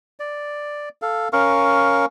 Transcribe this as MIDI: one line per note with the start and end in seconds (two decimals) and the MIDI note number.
0.20 0.89 74
1.02 1.28 69
1.02 1.28 77
1.33 2.06 61
1.33 2.06 70
1.33 2.06 77
1.33 2.06 85